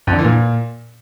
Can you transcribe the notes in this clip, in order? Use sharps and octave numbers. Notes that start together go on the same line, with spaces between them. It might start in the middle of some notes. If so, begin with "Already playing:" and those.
F2
D3
E3
A#2